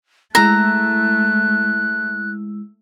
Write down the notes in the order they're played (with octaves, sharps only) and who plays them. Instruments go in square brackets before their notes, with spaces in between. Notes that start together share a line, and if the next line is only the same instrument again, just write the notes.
[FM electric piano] G#3 E4 E6 [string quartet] A3 [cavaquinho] A#5 [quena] F#6